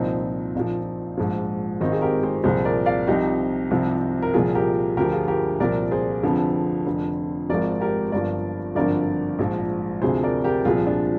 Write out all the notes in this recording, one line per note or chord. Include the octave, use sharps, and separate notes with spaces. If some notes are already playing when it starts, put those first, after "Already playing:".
Already playing: C2 A#2 F3 C4 D#4
A#1 A#2 F3
A#1 G#2 F3
G#1 G#2 D#3 C4 D#4
G#4
G4 A#4
G#4 C5
C2 A#2 F3 G#4 C5
A#4 D5
D5 F5
C2 C3 F3 D#4 G4
C2 C3 F3
A#4
C2 A#2 F3 F4 G#4
G4 A#4
D2 D3 F3 G4 A#4
F4 G#4
G4 A#4
C2 A#2 F3 A#4 D5
G#4 C5
F1 F2 D3 F3
F1 F2 D3
G#1 G#2 F3 A#4 D5
G4 A#4
G1 G2 F3 A#4 D5
G#1 G2 D3 F3 A#4 D5
A#1 G#2 F3
D2 C3 F3 G#4 C5
A#4 D5
G4 A#4
C2 A#2 F3 F4 G#4
D4 F4